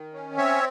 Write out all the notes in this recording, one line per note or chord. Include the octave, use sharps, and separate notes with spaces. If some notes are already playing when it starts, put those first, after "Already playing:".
Already playing: D#3
C#4
C4 C#5 E5